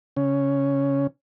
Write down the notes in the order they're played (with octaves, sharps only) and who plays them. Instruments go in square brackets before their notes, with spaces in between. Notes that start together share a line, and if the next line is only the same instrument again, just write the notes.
[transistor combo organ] C#3 C#4